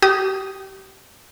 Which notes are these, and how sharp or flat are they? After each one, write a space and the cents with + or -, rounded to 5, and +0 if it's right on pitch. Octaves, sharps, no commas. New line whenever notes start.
G4 -30 D#6 +0